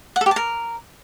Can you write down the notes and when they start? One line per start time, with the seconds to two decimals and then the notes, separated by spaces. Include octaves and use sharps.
0.16 F#5
0.21 A4
0.26 G4
0.31 A5
0.36 A#4